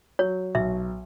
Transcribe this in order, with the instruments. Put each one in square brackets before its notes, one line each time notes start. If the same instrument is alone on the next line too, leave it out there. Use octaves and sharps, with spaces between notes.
[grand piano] F#3 [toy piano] C#5
[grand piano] B1 [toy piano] E5